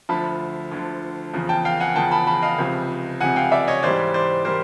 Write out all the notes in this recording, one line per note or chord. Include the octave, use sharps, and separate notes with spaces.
D2 D3 F3 A5 B5
D2 D3 F3
E2 C#3 F3
G5 A5
F5 G5
F#5 G#5
E2 C#3 F3 G5 A5
A5 B5
A5 B5
D#5 F5
C#2 C3 F3
C#2 C3 F3 F#5 G#5
F5 G5
D5 E5
C#5 D#5
G#2 E3 G3 C5 D5
C5 D5
E3 G3 A#4 C5